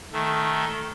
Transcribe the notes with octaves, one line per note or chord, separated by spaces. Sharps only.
D#3 A3